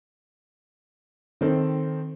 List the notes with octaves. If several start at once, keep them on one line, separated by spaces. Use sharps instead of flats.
D#3 C4 A4